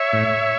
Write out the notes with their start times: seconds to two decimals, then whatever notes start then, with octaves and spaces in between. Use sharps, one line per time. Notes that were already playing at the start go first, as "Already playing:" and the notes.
Already playing: C#5 E5
0.13 A2